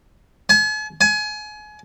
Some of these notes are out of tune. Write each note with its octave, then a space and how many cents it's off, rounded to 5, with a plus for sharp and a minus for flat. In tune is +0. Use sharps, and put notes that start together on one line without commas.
G#5 +45
G#5 +30